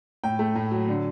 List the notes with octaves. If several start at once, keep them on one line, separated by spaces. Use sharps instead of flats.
A2 G5
A3
A2
F#3
D3